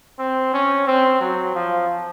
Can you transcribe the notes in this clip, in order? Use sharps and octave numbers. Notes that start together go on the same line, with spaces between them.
C4
C#4
C4
F#3
F3